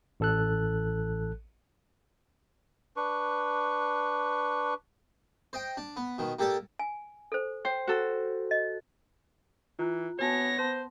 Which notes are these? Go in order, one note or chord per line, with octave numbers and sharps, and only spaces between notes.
A1 A4 F#6
D4 B4 C#6
C5 D#5 G5
D4
B3
B2 D#3
A#3 G4 A4 D5 D#6
G#5
A4 C5
C5 G5
F#4 A4
D#5
E3 F4 A#5 F#6
B3 F#4 C#5 G#5 A5 A#6
C5 A5 C6